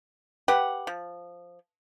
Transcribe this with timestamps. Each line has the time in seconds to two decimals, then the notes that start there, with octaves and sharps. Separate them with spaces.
0.48 G4 B4 F#5
0.87 F3